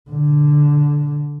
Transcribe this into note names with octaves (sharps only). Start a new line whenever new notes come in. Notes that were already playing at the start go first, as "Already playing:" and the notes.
D3